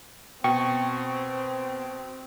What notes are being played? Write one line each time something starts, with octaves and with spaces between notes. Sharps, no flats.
B2 C4 G5 C#6